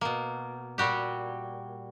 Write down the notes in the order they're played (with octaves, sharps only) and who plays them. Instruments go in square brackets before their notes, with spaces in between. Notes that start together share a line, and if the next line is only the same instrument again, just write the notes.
[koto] B2 A#3
A#2 G3 F#4 G4